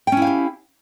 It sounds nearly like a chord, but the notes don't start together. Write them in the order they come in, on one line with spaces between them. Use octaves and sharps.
G5 C#4 E4 F5 G4